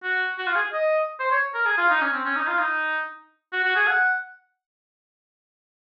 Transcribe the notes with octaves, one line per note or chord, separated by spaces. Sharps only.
F#4
F#4
F4
G#4
D#5
C5
C#5
A#4
G#4
F4
D#4
C#4
C4
C#4
D#4
F4
D#4
F#4
F#4
G#4
F#5